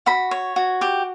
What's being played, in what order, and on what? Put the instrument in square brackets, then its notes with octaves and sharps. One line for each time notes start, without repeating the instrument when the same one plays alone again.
[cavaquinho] F#4 B5
C#5
F#4
G4